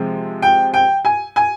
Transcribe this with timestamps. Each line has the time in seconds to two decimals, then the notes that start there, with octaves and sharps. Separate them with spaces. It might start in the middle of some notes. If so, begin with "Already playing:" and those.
Already playing: C3 F3 G#3 C4
0.42 G5
0.74 G5
1.05 G#5
1.36 G#5